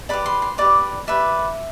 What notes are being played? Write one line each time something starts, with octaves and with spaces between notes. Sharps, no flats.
G4 B4 D5 B5
C6
C6
G4 B4 D5 D6
G4 B4 D5 E5